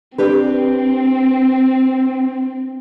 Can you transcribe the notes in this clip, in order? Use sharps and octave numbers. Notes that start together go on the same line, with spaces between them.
C4 D4 G4 B4